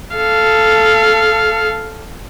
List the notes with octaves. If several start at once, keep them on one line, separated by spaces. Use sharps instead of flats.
A4 F5